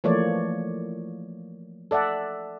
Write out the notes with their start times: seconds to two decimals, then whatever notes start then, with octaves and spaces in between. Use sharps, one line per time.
0.04 E3 F3 A3 A#3 C#5 D5
1.91 A4 D5 E5 F#5